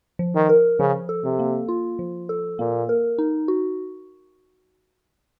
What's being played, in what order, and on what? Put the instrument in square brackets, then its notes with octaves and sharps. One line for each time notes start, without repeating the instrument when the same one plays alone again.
[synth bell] F3
[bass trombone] D#3
[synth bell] A#4
[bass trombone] C#3 [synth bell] F3
[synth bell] A4
[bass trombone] C3
[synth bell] A#3
F4
F3
A4
[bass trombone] A#2 [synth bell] A#3
[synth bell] A#4
D#4
F#4